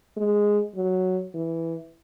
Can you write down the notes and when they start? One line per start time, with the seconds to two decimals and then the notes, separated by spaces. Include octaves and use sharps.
0.17 G#3
0.76 F#3
1.34 E3